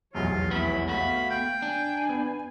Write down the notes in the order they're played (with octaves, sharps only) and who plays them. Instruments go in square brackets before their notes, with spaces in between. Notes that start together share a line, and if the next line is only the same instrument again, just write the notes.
[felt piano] F1 B1 E2 [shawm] F4 [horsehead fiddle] C#5
[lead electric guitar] B3 E4 [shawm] B5
[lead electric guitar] A3 F#4 [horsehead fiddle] B3 F5 [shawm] B5
[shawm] G5 [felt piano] G6
[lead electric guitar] D4 [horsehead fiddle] G#5
[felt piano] B3